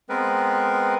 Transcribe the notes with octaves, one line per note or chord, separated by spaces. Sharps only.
G#3 B3 C4 A#4 B4